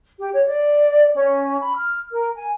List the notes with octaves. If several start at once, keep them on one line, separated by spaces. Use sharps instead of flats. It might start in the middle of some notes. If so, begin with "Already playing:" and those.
G4
C#5
D5
C#4
B5
F6
A#4
G#5